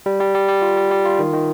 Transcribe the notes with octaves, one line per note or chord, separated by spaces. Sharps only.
G3
G3
G3
G3
F4
G3
G3
F4
D#3
D#3